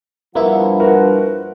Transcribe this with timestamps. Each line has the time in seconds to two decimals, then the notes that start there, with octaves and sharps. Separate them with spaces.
0.35 G2 F3 A#3 B3 E4 F#5
0.80 F#4 A#4 B4